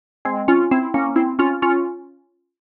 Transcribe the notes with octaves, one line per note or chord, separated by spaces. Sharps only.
G#3 C4
C#4 F4
C4 E4
A#3 C#4
C4 E4
C#4 F4
C#4 F4